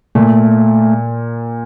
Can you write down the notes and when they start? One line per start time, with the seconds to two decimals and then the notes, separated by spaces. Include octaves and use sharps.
0.15 A#2 A3